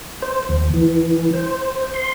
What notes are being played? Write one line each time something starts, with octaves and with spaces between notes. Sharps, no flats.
C5
D#2
E3
C5
C6